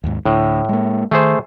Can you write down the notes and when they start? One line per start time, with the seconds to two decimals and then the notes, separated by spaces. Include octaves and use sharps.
0.04 D#2 G#2
0.25 D2 A2
0.69 G#3 A#3
1.11 D#3 A3 G#4 C5